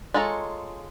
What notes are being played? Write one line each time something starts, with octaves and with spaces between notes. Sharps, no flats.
G#3 F4 A4 C#5 A#5